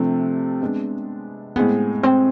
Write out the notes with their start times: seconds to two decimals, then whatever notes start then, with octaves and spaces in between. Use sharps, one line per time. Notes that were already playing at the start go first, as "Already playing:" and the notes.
Already playing: C3 F3 A3 C4 D4
0.62 G#3 B3 D4
1.56 A2 G#3 B3 C4 G#4
2.03 C4